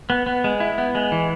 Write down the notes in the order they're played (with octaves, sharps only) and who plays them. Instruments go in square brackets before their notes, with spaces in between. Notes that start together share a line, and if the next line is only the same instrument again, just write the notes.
[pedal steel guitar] B3
B3
G#3
E4
B3
G#3
E3